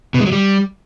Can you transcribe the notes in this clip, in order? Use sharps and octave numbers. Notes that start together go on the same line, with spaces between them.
B2
G#3
F#3
G3